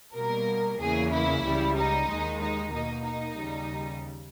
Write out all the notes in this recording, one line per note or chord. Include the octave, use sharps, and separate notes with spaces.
B2 G3 A#3 A#4
E2 C#3 E3 A#3 G#4
E4
C#2 C#3 G3
D#4
D#2 D#3 G#3
D#4
B2 A#3 D#4
D#4
D#2 C#3 G3